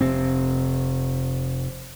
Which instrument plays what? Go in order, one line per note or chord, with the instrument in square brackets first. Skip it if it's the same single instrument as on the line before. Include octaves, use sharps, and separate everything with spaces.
[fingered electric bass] F1 C3 C4